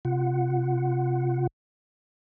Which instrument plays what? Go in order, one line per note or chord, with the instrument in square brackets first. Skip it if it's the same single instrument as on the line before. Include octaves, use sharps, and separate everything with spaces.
[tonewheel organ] C3 F4 F#5